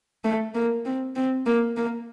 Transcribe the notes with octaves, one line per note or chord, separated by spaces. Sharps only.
A3
A#3
C4
C4
A#3
A#3